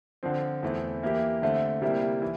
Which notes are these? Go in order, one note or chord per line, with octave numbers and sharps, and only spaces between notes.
D3 F3 C4
E2 E3 A3 C4
E3 A#3 E4 G4
D3 A3 C4
C3 G3 A#3 E4
E3